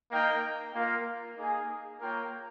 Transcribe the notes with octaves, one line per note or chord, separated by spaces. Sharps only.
A#3 D#4 A#4 D#5 G5
A#3 F4 A#4 F5
A#3 D#4 G#4
A#3 F4 A#4 C#5 G5